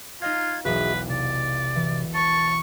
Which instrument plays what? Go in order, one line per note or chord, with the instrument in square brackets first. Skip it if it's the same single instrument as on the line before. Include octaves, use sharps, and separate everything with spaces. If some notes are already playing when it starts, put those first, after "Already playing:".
[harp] D#4 D#5 F5 [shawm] F4 [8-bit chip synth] G#6
[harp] E1 B1 [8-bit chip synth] F#4 G#4 E5 [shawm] B4
[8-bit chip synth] C3 [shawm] D5
[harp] E3
[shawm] A5 [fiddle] C#6